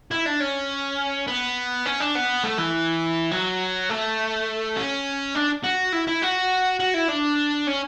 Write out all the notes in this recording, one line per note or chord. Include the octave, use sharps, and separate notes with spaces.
E4
D4
C#4
B3
C#4
D4
B3
A3
E3
F#3
A3
C#4
D4
F#4
E4
E4
F#4
F#4
E4
D4
C#4